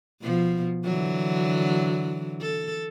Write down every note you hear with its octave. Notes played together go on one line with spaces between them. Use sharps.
B2 F3
D3 E3 F#3
A4